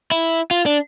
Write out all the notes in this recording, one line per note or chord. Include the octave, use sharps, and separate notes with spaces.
E4
F4
D4